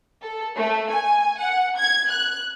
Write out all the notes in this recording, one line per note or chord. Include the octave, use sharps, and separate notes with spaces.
A4
A3
G#5
F#5
G#6
F#6